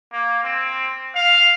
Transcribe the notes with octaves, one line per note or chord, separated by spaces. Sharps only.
A#3
C4
F5